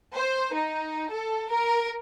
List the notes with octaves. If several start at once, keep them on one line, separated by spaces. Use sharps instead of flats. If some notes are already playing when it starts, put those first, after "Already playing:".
C5
D#4
A4
A#4